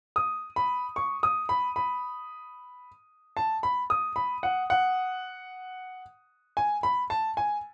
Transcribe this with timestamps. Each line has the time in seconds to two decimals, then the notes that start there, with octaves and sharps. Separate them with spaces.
0.16 D#6
0.56 B5
0.96 C#6
1.23 D#6
1.49 B5
1.76 B5
3.37 A5
3.63 B5
3.90 D#6
4.16 B5
4.43 F#5
4.70 F#5
6.57 G#5
6.83 B5
7.10 A5
7.37 G#5